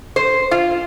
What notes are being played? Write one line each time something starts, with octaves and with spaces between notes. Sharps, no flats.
C5
F4